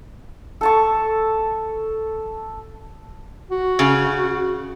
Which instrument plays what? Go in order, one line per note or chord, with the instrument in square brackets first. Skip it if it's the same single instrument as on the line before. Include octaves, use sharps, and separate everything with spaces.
[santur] A4 A5 C#6
[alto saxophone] F#4
[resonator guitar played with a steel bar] C#3